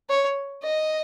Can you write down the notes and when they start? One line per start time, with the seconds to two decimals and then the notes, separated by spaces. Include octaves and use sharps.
0.10 C#5
0.63 D#5